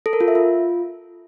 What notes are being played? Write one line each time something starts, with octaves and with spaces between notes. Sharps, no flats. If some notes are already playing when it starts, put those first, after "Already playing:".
A4
A#4
F4
E5
F4